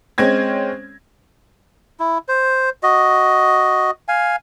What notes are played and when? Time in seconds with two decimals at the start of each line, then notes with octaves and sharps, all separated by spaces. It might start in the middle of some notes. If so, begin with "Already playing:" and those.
0.18 G#3 C4 C#4 G#6 A#6
2.00 E4
2.28 C5
2.83 F#4 D#5
4.08 F5 G#5